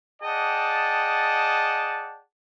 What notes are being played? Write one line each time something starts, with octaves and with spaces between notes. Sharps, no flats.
G#4 D5 D#5 F#5 G5 A5